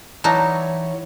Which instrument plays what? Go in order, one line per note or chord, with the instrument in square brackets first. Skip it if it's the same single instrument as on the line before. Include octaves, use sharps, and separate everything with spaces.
[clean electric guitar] E3 E4 [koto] F#3 G3 D#4 [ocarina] C#5 [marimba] A5 A#5